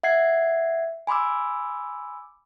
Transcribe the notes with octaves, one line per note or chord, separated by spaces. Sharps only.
E5 F#5 G#6 C7
G#5 B5 C6 D6 E6